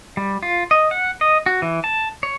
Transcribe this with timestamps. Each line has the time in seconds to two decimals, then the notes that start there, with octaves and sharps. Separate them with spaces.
0.17 G3
0.43 F4
0.71 D#5
0.91 F#5
1.21 D#5
1.46 F#4
1.62 E3
1.84 A5
2.23 C#5